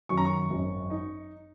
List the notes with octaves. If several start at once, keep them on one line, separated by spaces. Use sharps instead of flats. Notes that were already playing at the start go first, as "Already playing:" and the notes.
F#2 D#3 F#3 C#6
A#5
C#6
G#1 F#2 F#3
D#4